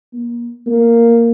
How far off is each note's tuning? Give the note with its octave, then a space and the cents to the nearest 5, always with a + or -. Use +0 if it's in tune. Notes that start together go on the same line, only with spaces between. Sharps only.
A#3 +30
A#3 -5